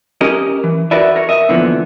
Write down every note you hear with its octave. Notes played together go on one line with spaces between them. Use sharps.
C#4 G4 A#4 D#5
E3
F#4 A#4 B4 D5 E5
A#4 C#5
D#5 E5
A#2 D3 E3 F3 B3